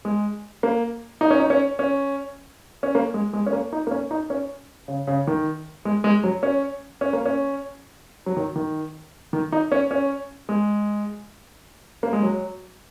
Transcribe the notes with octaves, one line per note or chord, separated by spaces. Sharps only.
G#3
A#3
D#4
C#4
D#4
C#4
C#4
C#4
A#3
G#3
G#3
C#4
A#3
D#4
A#3
C#4
D#4
C#4
C#3
C#3
D#3
G#3
G#3
F#3
C#4
C#4
A#3
C#4
F#3
D#3
D#3
D#3
D#4
C#4
C#4
G#3
A#3
G#3
F#3